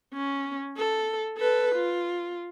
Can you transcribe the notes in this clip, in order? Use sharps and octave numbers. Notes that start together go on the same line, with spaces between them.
C#4
A4
A4 B4
F4